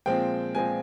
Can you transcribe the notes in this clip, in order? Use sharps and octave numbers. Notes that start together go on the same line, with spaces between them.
A#2 F3 G#3 C4 G5
A#2 F3 G#3 C4 G#5